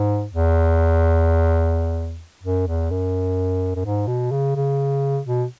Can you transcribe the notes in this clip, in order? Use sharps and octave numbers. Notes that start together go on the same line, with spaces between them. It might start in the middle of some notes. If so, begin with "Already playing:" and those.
Already playing: G#2
E2
F#2
E2
F#2
F#2
G#2
B2
C#3
C#3
B2